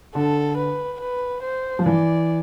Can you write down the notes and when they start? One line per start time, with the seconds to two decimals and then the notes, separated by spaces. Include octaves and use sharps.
0.15 D3 A4
0.57 B4
1.01 B4
1.43 C5
1.79 F3
1.86 E3 D5